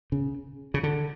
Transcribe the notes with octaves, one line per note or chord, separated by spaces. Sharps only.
C#3
C#3
D3